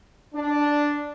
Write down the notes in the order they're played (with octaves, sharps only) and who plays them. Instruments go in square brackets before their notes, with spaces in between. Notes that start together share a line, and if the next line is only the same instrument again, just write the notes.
[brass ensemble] D4